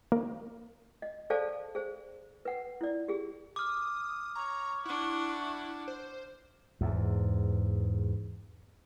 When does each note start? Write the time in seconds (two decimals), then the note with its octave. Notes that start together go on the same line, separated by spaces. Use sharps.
0.12 A#3
1.02 D#5
1.30 G#4 A4 C5 D5 F5 A5
1.75 G#4 C5
2.45 B4 F#5
2.81 E4 D5
3.08 G4 G#4
3.56 D6 D#6 F6
4.35 C#5 A#5 C#6
4.85 D4 E4 F#5
5.88 C5
6.81 E2 G#2